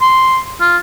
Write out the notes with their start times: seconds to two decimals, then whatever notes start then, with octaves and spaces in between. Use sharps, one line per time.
0.01 C6
0.61 F4